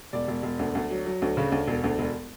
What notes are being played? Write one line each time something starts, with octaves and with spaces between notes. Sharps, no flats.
E1 D5
E1
E1
D2
D2
F#3
F#3
D2
C#3
D2
E1
D2
E1